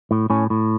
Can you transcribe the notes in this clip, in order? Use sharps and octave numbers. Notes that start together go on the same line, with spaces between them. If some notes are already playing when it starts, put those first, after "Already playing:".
A2
A2 C#4
A2